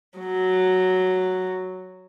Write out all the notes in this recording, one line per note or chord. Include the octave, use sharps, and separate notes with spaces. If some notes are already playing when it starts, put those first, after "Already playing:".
F#3